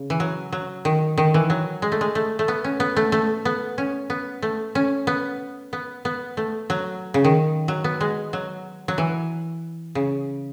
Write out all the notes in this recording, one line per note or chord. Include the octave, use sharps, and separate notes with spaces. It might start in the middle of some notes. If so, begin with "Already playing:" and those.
Already playing: C#3
E3
F#3
F#3
D#3
D#3
E3
F#3
G#3
A3
G#3
A3
A3
B3
C#4
B3
A3
A3
B3
C#4
B3
A3
C#4
B3
B3
B3
A3
F#3
C#3
D#3
F#3
B3
G#3
F#3
F#3
E3
C#3